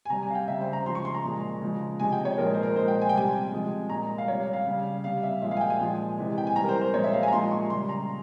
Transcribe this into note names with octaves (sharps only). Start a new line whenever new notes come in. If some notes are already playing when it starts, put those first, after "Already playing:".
G#5
C3 G3 A#5
G#5
F5
G5
C#3 G3 E5
C5
A#5
C#3 F3 G#3 C6
C#6
C6
A#5
A#2 F3 G#3
C#3 F3 G#3
C3 F3 G#3 G#5
G5
C#5
A#2 F3 G#3 A#4
C5
A#4
A#2 F3 G#3 C5
G5
G#5
G5
C3 G3 G#5
C3 F3 G#3
A#2 G#3 A#5
F5
C3 G3 C#5
F5
F5
C#3 G3
C3 G3 F5
E5
A#2 F3 G#3 E5
F5
G#5
G5
G#5
A#2 F3 G#3
C3 E3 G#3
G5
G#5
C3 E3 G3 A#5
A#4
C5
C5
A#2 F3 G#3 C#5
E5
F5
G#5
A#5
A#2 F3 G#3 C6
C#6
C#3 G3 C6
A#5